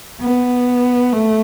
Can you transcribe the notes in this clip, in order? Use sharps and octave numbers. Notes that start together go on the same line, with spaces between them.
B3
A3